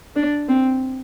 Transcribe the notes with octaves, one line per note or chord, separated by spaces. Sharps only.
D4
C4